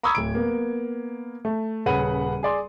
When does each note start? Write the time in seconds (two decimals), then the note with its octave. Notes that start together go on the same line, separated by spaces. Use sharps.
0.03 A#5 B5 C#6 D#6 E6 G#6
0.15 D1 D7
0.35 A#3 B3
1.45 A3
1.86 D#1 C#3 B4 F#5 B5 D#7
2.43 G#4 D5 C6